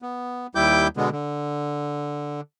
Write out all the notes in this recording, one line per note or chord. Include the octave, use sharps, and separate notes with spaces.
B3
D#2 G3 E4 G5 D6 G6
B2 D3 G#3 B3
D3